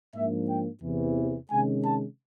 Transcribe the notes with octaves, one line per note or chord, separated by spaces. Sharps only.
G#2 F3 A#3 D4 E5
G5
E2 C3 E3
C3 D#3 G#3 C#4 G#5
A5